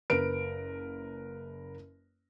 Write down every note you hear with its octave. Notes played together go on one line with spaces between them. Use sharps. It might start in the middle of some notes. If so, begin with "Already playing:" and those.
F#1 A#4 B4 D7